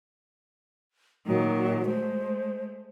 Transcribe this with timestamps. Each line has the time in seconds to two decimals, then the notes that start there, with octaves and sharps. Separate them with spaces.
1.27 A#2 D#3 F#3
1.86 G#3 A3 C5